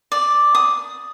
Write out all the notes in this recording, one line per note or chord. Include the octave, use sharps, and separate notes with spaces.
D5
D#6